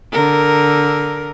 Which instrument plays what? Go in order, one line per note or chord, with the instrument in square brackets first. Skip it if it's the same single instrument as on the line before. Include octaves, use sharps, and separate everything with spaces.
[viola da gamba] D3 A#4